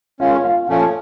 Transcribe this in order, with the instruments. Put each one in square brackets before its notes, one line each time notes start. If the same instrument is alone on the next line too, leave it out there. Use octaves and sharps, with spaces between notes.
[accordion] D#3 G#3 C#4 [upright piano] F4 F5
[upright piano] F4 F5
[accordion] A#2 F3 A3 C#4 [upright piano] F4 F5